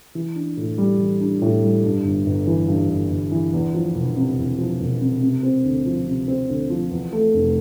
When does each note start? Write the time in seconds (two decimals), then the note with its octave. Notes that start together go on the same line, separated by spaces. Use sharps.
0.15 E3
0.36 D4
0.57 A2
0.78 G3
0.99 E3
1.21 D4
1.42 A2
1.63 G3
1.84 G2
2.05 G1
2.26 G1
2.47 E3
2.68 G2
2.89 G1
3.10 G1
3.32 E3
3.53 E2
3.74 F3
3.95 E1
4.16 C3
4.37 E2
4.58 F3
4.80 E1
5.01 C3
5.22 C3
5.43 C4
5.64 D2
5.86 F3
6.06 C3
6.28 C4
6.49 D2
6.70 F3
6.91 E2
7.12 A3
7.34 F1